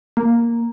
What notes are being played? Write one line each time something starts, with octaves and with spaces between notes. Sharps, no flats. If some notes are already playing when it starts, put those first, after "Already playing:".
A#3